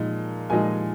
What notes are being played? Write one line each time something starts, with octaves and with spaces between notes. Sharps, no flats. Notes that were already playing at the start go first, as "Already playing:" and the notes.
Already playing: A#2 F3 G#3 D#4
A#2 F3 G#3 D#4 G#5